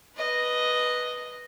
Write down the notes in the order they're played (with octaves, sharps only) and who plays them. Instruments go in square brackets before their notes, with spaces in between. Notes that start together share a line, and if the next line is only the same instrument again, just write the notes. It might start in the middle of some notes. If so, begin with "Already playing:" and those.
[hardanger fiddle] B4 D#5